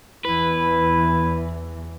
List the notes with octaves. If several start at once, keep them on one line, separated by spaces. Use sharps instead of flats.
E2 E3 E4 B4